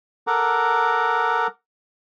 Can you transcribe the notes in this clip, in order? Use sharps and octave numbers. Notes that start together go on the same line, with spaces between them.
A4 A#4 F#5 A#5 D6